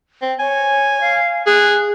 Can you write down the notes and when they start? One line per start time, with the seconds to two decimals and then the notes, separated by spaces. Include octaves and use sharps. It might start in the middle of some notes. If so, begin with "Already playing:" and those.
0.22 C4
0.39 C#5 G#5
1.01 F5
1.47 G#4 F#6